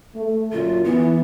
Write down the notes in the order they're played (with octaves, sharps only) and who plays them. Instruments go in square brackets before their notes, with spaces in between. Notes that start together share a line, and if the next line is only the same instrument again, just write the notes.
[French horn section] A3
[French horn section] F#2 A#2 D3 [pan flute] F4
[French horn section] E3 [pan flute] B3